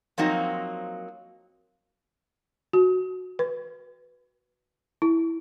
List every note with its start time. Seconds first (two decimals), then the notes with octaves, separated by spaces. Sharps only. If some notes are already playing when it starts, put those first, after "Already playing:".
0.18 F3 F#3 A#3 C4 D#4
2.73 F#4
3.39 B4
5.02 E4